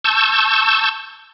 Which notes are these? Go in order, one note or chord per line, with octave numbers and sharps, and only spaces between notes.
A5 C#6 E6 G6